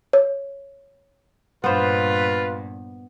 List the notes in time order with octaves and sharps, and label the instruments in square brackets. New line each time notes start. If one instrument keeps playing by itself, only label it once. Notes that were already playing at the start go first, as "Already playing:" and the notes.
[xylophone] C#5
[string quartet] G2 A#2 [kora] B3 C5 [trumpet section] F4 B4